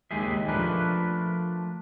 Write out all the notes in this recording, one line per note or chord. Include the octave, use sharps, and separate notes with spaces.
D#2 G#3 G4 G#4 E5
F3 A3 D4 A#4 B4